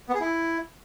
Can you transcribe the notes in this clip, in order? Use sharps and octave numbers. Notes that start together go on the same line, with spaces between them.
B3
G#4
E4